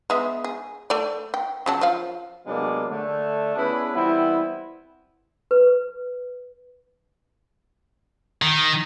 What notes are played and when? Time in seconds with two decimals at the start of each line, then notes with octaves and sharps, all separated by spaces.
0.10 G#3 B3 E5
0.44 G#4
0.90 A3 D5
1.34 G5
1.66 C#3 F#3 A5
1.81 F3 F5
2.46 C3 F#3 G#3 A#3 B3 D4
2.90 D3 A3
3.55 B3 C#4 D4 E4 G#4 B4
3.94 E3 G3 B3 C4 E4
5.51 B4
8.42 D#3